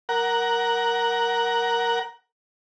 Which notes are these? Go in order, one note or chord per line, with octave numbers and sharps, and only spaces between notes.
A#4 F#5